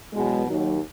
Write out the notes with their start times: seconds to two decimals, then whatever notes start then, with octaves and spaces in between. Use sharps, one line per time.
0.13 E2 B2 F#3 G#3
0.46 D#2 D#3 F#3